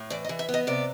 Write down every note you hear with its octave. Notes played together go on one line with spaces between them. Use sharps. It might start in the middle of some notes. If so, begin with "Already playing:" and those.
Already playing: A2
E3 D5
D#5
E3
E5
B3
D#5
C3 D5